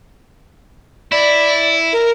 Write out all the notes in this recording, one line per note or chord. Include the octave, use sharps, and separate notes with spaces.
E4 D5
A#4